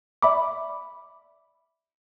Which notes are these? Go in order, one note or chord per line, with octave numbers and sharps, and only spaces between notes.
D5 E5 B5 D6